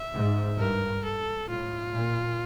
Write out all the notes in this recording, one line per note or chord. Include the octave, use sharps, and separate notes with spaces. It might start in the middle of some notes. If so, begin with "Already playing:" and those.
Already playing: E5
G#2
G2 A#4
A4
A2 F4
A#2